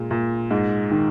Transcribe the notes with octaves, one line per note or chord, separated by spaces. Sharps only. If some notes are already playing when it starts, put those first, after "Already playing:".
Already playing: A#2 G#3
A#2
G#2
D#3